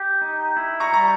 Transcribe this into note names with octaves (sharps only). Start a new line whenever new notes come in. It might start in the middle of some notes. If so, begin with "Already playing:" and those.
Already playing: G4
D#4
E4
A#5 C#6
G3 A#5